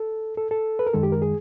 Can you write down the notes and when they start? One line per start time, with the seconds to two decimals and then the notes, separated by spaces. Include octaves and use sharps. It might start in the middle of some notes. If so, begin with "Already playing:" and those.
Already playing: A4
0.37 A4
0.51 A4
0.79 B4
0.87 A#4
0.93 F#2 D#3 G#3 A4
1.03 G4
1.12 A#4
1.22 G#4